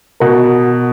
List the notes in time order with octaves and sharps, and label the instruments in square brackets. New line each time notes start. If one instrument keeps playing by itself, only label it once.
[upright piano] B2 [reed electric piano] F#4 A#4